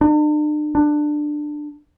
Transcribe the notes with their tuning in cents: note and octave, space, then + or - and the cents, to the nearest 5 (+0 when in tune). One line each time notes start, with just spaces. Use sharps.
D4 +45
D4 +20